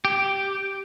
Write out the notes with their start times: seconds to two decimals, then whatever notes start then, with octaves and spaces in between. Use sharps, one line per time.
0.05 G4